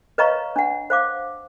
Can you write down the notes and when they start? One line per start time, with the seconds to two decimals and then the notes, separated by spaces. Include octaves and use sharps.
0.18 B4 C#5 D#5 F5 A#5 C#6
0.56 D4 F#5
0.90 C5 F5 D6